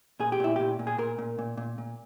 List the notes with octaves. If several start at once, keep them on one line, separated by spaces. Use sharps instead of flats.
A#2 G#4
G4
A#2 E4
A#2 G4
A#2
G#4
A#2 A#4
A#2
A#2
A#2
A#2